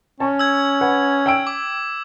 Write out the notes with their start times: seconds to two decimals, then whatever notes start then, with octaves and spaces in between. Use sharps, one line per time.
0.20 C#4 A5 C#6
0.39 E6 G#6
0.81 B4 F#5
1.26 G5 E6 D7
1.47 D6